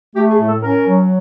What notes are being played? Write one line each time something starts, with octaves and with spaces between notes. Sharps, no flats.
A3 G4
G#4
A2
A4
C#4 A#4
F#3